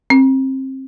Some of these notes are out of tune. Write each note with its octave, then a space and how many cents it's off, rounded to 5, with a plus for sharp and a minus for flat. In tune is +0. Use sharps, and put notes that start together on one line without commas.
C4 +25